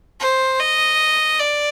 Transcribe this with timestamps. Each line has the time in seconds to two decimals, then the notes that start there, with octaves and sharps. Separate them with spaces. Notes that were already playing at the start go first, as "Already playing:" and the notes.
0.21 C5
0.60 D#5
1.40 D5